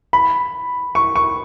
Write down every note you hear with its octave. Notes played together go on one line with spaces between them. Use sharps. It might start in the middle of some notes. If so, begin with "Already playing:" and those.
B5
C#6
C#6